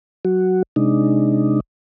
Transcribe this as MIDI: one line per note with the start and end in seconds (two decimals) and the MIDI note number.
0.25 0.63 54
0.25 0.63 66
0.76 1.60 48
0.76 1.60 56
0.76 1.60 62
0.76 1.60 63